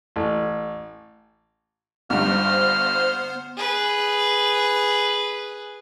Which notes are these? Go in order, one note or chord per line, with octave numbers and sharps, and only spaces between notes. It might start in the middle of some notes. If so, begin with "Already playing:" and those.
A1
G1 G2 B3 C5 F6
G#4 B4